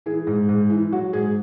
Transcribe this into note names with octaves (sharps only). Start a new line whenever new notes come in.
E3 G#4
G#2
G#2
E3
F#3 F#4
G#2 G#4